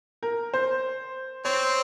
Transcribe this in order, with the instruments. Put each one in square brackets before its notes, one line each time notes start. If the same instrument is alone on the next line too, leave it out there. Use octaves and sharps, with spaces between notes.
[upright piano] A#4
C5
[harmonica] C4 [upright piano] C#5